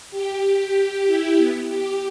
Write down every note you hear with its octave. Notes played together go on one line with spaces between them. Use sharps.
G4
G4
E4
B3
G4